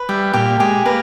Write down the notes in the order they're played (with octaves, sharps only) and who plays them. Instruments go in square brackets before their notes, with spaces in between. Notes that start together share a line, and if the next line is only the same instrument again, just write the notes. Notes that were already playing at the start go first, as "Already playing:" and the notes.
Already playing: [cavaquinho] B4
[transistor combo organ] G3 [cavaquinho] E5
[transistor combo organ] A#2 [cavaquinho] G4
[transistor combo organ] G#3 [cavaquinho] G4
[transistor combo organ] A#3 [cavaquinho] B4